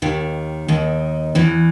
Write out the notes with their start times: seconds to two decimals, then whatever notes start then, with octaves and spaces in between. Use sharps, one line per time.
0.02 D#2 D#3
0.68 D#2 D#3
1.35 E2 E3